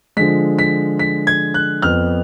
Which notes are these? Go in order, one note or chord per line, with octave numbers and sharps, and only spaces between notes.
D3 F3 G#3 B6
B6
B6
G#6
F#6
F2 F3 B3 F6